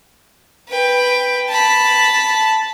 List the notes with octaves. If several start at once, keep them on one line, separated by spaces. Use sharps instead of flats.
B4 G5
A5 B5